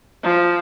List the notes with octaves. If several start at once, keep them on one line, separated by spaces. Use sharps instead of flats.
F3